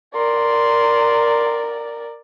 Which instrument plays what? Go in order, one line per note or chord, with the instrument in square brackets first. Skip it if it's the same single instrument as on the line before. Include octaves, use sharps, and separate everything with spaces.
[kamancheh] A#4 D5 [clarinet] C6